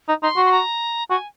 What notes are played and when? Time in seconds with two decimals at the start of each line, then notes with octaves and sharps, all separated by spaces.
0.08 D#4
0.22 D#4 C6
0.37 F#4
0.46 C6
0.52 A#5
1.10 F#4 G#5